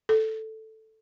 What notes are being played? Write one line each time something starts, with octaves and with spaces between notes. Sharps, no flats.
A4